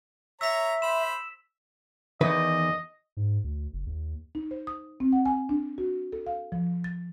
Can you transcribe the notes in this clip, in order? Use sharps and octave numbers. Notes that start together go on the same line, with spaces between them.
C#5 E5 A#5 E6 B6
C5 B5 E7
E2 D#3 B4 D#5
G#2
D2
F#1
D#2
D#4
C5
D#6
C4
F#5
G#5
D4
F#4
A4
F5
F3
A6